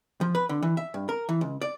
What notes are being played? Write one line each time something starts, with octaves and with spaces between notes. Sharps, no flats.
F3
B4
D3
E3
E5
G2
A#4
E3
C#2
D5